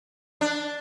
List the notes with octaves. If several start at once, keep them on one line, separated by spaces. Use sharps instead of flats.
D4